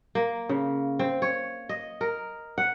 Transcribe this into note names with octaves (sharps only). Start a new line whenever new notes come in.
A#3
C#3
C4
C#5
D#5
A#4
F#5